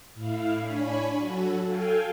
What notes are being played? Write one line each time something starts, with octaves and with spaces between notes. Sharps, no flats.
A2 E4 F5
D4 C#5 G#5 B5
F#3 F#4 A4
A4 F5 G5 G#5